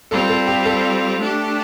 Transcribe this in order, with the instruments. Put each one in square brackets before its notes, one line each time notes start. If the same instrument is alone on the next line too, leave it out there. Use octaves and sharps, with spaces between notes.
[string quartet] G3 C4 F4 [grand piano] A4
[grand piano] A4
G4
A4
[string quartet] A3 D4 G4